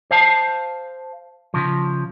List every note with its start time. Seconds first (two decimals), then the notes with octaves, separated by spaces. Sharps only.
0.11 C5 F5 A5
1.54 C#3 F3